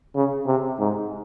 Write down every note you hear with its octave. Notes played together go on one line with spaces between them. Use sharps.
C#3
C3
G#2